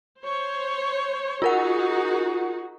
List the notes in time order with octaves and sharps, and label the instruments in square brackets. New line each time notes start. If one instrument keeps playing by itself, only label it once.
[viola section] C5 C#5
[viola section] D#4 F#4 G#4 [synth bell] F4 A#4 F#5